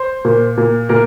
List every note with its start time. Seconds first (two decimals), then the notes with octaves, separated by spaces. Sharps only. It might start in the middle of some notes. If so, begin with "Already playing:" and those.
Already playing: C5
0.25 A#2
0.57 A#2
0.89 A#2 A#4